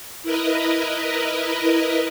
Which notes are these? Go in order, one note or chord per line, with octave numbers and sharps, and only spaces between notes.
E4 A#4 B4 D#5